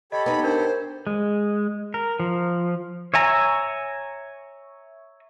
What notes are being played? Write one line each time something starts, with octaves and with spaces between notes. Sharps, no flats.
G4 A4 C#5 D#5 B5
B3 D#4 B5
D4 A#4 C5
G#3
A#4
F3
C#5 E5 G#5 A#5